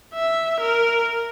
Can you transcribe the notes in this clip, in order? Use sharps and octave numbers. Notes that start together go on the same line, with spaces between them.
E5
A#4